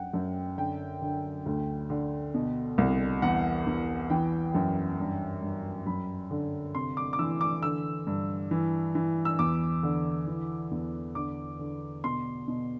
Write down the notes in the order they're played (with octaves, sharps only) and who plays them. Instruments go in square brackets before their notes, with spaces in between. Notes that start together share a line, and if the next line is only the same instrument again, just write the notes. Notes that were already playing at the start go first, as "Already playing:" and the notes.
Already playing: [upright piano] F#2 F#5 G5
F#2
D3 G5
D3
D2
D3
B2
C2
E2 F#5
E2
E3 G5
F#2
G2
G2
F#2 B5
D3
C3 C6
D6
D6
E3 E6
D6
D3 E6
G2
E3
E3
E6
E2 D6
D3
E3
E2
D3 D6
D3
B2 C6
B2